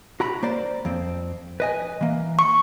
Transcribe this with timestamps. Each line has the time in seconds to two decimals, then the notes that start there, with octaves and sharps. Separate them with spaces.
0.20 F#4 A#5 B5
0.43 A#3 C5 D5
0.85 F2 C4
1.60 B4 D#5 G#5
2.01 E3 A#3
2.39 C#6